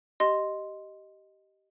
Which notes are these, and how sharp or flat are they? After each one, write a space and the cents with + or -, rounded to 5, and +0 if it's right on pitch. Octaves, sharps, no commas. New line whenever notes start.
G4 -15 D#5 +0 C6 +0